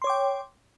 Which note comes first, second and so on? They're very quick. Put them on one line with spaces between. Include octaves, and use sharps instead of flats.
C6 C#5 D6 G5